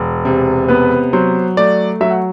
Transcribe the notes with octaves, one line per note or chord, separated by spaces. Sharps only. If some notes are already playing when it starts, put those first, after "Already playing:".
Already playing: E1
C3
B3 B4
F#3 C5
A3 D5
F#3 E5
F#5